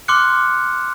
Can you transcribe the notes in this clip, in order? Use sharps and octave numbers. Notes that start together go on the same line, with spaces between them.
C6 D6 F6 F#6 C#7